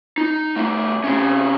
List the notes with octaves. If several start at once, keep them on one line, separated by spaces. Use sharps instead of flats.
D#4
C2 A3
C3 C#4